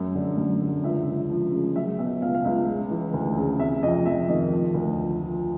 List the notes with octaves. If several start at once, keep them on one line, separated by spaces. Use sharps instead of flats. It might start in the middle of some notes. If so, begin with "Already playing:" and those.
Already playing: F#2
D3
F#2
D3
C#2 E5
C#2
F3
C#3
F#3 E5
B2 E5
C#2 F5
F5
C#2 E5
C#3
E3
D2
C#3
C3 E5
F2 D#5
F2 E5
D#3 D#5
F3
D2
F3
F3